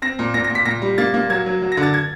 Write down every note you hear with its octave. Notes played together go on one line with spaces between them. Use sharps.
C4 A#6
A#2
A#2 A#6
A#6
A#2
B6
A#2 A#6
G3
A#3 A6
A#3
F#3 G#6
F#3
F#3
A#6
D3
A6
G#6